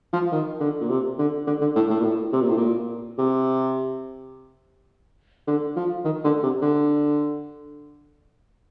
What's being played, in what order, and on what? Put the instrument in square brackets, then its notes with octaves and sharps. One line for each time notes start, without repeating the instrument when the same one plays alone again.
[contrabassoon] F3
D#3
D3
A#2
C3
D3
D3
D3
A2
A2
A#2
A2
C3
A#2
A2
A#2
C3
D3
F3
D#3
D3
C3
D3